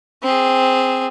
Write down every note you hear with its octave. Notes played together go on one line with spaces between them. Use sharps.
C4 G#4